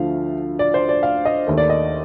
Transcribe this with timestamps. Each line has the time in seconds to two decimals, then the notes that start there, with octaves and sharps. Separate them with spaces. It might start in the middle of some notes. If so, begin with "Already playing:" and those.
Already playing: D2 D3 F3 A3 F5
0.59 D5
0.74 C5
0.89 D5
1.03 F5
1.25 D#5
1.47 D#2 D#3 A3
1.58 D5
1.70 D#5